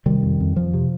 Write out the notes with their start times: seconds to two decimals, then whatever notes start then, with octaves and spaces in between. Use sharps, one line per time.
0.06 C3 D#3 G3
0.23 F2
0.40 F2
0.56 F2 F3
0.74 C3